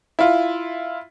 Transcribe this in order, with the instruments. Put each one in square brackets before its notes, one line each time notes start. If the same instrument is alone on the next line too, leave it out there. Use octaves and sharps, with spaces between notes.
[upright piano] E4 F4